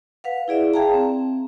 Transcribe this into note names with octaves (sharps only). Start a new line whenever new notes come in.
B4 F5 F#5
E4 G#4 D5 E5
G#4 F5 G5 A5 A#5
C4